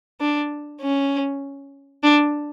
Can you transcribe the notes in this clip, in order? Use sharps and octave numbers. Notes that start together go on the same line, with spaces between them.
D4
C#4
D4